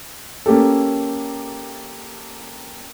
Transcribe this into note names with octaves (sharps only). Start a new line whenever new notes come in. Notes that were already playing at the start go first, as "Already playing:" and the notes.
A#3 C#4 G4 A4